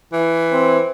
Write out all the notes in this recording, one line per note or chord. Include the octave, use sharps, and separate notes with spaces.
E3
C4